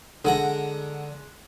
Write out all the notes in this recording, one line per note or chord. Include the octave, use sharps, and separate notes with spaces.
D3 G#3 F#5 A#5